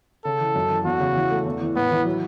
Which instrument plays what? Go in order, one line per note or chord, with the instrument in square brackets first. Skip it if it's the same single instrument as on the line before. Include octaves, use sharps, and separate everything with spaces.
[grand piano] C#3 [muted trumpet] A4
[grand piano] E3
F#2
E3
[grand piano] E2 [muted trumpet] F#4
[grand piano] C#3
E3
A3
E2
E3
[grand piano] A2 [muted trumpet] B3
[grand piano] E3
F#3